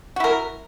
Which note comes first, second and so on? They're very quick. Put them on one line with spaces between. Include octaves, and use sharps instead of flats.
F#4 E4 A#4